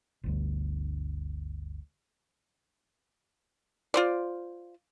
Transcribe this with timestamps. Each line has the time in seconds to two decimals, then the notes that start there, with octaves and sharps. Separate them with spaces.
0.24 G1 D2
3.94 F4 C5 D5